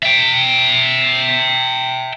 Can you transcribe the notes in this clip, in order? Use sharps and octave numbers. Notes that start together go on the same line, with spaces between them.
E5 G5